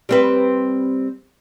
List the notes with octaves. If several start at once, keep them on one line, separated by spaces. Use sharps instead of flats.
G3 C4 B4